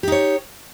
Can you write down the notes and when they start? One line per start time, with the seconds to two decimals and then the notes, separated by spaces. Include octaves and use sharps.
0.03 G4
0.08 D#4
0.12 C#5